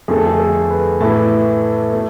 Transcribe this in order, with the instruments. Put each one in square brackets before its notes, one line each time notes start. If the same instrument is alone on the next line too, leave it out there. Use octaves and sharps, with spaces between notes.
[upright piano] F2 D3 A3 G#4
A4
G#4
A4
B4
A2 E3 A3 E4 A5
A3